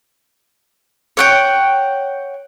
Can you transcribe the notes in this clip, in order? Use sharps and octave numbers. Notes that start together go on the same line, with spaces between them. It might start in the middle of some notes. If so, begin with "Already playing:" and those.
C#5 F#5 G5